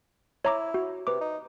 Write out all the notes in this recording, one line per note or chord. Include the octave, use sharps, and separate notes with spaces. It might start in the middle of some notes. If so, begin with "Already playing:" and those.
E4 C#5 A#5 D6
F#4
C3 B4 D6
D#4